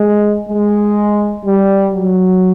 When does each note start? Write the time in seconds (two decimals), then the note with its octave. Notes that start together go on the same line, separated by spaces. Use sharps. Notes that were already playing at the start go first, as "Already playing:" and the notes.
Already playing: G#3
0.48 G#3
1.45 G3
1.94 F#3